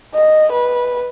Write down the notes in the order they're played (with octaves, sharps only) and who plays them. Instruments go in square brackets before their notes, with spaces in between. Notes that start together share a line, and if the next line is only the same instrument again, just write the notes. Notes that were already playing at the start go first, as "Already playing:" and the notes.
[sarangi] D#5
B4